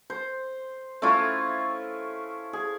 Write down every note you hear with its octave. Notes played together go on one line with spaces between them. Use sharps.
C5
A3 C#4 E4 F4
G#4